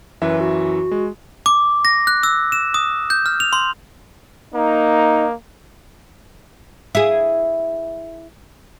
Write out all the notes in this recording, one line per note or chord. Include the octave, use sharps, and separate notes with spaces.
F#2 E3 B4 E5
F#4
G#3
D6
A#6
F#6
E6
E7
D#6
G6
F6
F7
C6
A#3 D#4
E4 G#4